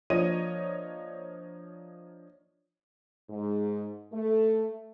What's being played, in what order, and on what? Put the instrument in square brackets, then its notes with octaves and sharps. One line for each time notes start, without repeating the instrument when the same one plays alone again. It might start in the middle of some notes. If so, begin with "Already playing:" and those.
[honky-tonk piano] F3 A#3 D4 C#5 D#5 D#7
[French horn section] G#2
A3